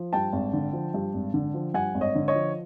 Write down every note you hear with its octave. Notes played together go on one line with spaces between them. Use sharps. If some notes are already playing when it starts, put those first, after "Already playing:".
Already playing: F3
G2 G5 A5
G#1
D3
F3
G2
G#1
D3
F3
G2 F#5 G#5
G#1
C#5 D#5
D3
C#5 D#5
F3